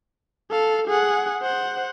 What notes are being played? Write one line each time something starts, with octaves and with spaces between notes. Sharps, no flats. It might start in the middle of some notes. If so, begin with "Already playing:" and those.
A4 F5
G#4 F#5
C5 F#5